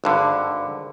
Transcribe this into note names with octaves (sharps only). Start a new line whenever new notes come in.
G#1 G2 D3